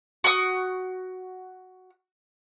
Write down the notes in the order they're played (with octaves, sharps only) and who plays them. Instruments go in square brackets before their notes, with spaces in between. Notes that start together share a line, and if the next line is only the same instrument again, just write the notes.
[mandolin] F#4 C#6 D#6